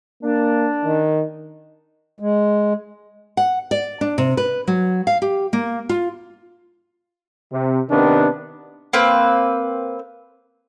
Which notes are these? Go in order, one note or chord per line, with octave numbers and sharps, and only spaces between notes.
A#3 D4
D#3
G#3
F#5
D5
D4
C3
B4
F#3
F5
G4
A#3
F4
C3
C3 D#3 B3 D4
A#3 C4 B4